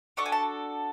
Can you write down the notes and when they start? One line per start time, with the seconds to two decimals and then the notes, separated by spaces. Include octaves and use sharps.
0.17 D4 F#4 A4 C#6
0.26 G#5
0.32 A5